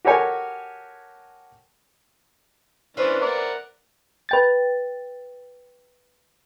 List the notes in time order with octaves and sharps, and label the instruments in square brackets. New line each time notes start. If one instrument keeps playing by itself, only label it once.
[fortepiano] F#4 G4 A4 A#4 C#5 G#5
[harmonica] E3 C#4 D4 [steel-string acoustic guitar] B4 C5 E5
[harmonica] A#4 D5 F#5
[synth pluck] B4 G5 A6